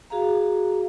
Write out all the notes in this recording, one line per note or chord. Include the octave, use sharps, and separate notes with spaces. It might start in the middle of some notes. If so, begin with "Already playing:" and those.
F#4 G#4 F5 A#5